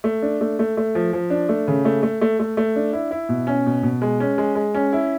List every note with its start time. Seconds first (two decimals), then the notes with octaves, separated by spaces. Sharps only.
0.04 A3
0.22 D4
0.41 A3
0.59 A3
0.77 A3
0.95 F3
1.13 F3
1.30 D4
1.49 A3
1.68 C#3
1.85 A3
2.03 A3
2.21 A3
2.40 A3
2.57 A3
2.76 D4
2.93 E4
3.11 E4
3.29 B2
3.47 C#4
3.66 B2
3.83 B2
4.02 G#3
4.20 C#4
4.38 G#3
4.55 G#3
4.75 C#4
4.93 E4